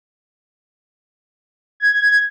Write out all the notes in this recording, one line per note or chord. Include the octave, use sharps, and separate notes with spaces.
G#6